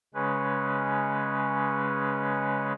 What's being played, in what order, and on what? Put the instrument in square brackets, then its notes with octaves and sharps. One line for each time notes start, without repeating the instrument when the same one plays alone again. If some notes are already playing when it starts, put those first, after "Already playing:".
[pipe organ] C#3 G#3 C#4 B4